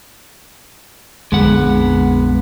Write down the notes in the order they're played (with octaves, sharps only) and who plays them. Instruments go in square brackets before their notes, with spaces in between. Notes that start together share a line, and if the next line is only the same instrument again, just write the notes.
[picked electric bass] A#1 F2 D3 [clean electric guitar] G#3 B3 F#5